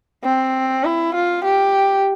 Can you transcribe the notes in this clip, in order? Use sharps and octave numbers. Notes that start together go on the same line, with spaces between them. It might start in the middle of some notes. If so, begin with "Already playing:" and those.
C4
E4
F4
G4